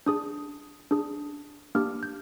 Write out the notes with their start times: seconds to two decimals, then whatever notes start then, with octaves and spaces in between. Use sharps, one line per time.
0.06 D4 G#4 D#6
0.91 D4 G#4
1.75 A#3 D4 G4 F6
2.03 G6